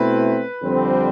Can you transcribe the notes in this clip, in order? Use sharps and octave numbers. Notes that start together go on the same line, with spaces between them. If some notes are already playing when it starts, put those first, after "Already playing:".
Already playing: B2 A3 C4 E4 B4
F2 D3 G3 C4